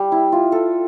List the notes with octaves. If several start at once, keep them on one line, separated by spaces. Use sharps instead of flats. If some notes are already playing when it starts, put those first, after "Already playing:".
Already playing: G3
E4
F4
A4